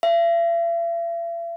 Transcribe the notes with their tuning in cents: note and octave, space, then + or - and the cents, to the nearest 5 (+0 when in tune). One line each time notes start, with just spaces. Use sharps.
E5 +45